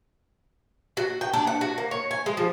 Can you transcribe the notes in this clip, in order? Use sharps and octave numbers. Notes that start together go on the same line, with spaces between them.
F#4
G5
D4
F#5
F#4
A#3
C#5
G#5
G#3
F3